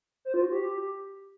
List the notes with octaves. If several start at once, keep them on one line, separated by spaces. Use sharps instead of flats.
C5
F4
F#4
G4